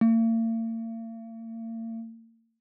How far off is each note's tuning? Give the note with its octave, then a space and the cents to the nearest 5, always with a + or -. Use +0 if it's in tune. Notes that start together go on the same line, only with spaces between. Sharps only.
A#3 -45